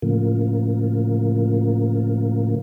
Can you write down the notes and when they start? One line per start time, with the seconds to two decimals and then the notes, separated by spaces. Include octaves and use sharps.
0.02 A2 C#3 F3 A#3